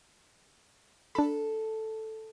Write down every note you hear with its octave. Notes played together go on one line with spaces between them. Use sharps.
D4 A4 B5